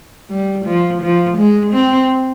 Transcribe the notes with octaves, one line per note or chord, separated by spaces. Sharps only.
G3
F3
F3
G#3
C4